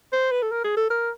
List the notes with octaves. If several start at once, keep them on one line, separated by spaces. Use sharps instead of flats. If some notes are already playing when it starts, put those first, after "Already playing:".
C5
B4
A4
A#4
G#4
A4
A#4